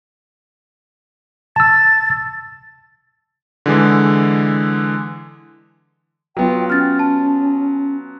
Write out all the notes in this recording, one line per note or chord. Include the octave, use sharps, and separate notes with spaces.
A5 E6 A6
D3 E3 G#3
F#3 B3 F4 G5
C#4 F6 A6
A5